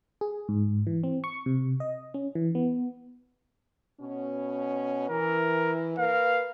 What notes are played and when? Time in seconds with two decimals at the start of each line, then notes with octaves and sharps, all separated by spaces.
0.21 G#4
0.49 G#2
0.87 E3
1.04 C4
1.24 C#6
1.46 C3
1.80 D#5
2.14 C#4
2.35 E3
2.55 B3
4.01 B2 C#4
5.09 E3 A#4
5.98 A#3 A#4 B4 F5